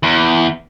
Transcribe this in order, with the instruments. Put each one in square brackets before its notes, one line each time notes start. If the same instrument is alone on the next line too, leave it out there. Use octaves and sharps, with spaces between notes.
[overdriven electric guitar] E2